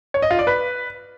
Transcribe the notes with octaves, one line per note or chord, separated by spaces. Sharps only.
C#5
D#5
F4
D5
B4